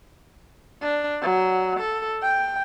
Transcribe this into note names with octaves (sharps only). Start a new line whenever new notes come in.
D4
F#3
A4
G5